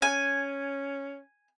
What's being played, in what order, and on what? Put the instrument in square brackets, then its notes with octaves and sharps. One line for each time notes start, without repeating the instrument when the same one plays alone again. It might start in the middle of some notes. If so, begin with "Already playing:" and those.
[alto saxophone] C#4 [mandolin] G#5